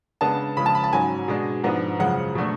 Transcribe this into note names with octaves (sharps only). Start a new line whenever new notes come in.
C#3 G#3 B3 D4 A5
C#3 F3 G#3 B5
A5
B5
A5
G#2 F#3 C#4 G#5
B2 G#3 D4
G#2 F3 B3 D4
F#2 C#3 F3 G#3 F#5
B2 F#3 A3 D4